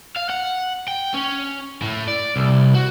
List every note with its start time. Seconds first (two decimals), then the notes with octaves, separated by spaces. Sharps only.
0.17 F5
0.30 F#5
0.88 G5
1.14 C#4
1.82 A2
2.07 D5
2.36 C2
2.74 F#4